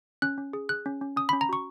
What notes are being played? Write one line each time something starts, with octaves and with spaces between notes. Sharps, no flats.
C#4 F#6
C#4
G#4
G#4 F#6
C#4
C#4
C#4 D#6
B5
C#4
A#5
F#4 C#6